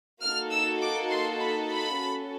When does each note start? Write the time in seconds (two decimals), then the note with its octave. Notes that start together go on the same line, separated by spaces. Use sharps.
0.22 A#3 D#4 F#4 A4 F6
0.51 E6
0.82 D6
1.11 C6
1.40 B5
1.69 B5
2.00 C#4 F#4 A4